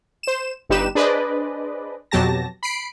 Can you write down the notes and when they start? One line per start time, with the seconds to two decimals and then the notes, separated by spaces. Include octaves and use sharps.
0.23 C5 E7
0.69 G1 G2 D#4 G4 B4 E7
0.95 D4 G#4 B4 C5 D5 D#5
2.11 F2 B2 F#3 G4 A5 A#6
2.63 B5 C7 D7